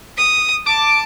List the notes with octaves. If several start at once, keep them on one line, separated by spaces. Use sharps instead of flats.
D#6
A5 D6